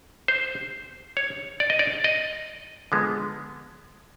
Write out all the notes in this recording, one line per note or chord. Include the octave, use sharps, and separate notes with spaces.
C5
C#5
D5
D#5
D5
D#5
D3 F3 G#3 B3